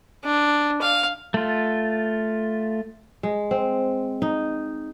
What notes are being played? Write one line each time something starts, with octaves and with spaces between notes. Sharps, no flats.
D4
F5
A3 F4
G#3
C4
D#4